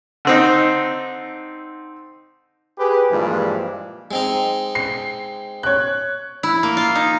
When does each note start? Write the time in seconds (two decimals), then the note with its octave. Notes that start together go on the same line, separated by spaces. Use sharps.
0.25 D3 C4 D#4
2.78 G4 G#4 B4
3.11 G2 A#2 E3 F3 G#3
4.11 G#3 C4 D#4
4.75 C7
5.63 C#5 F#6
6.43 E4
6.63 A#3
6.77 F4
6.95 D#4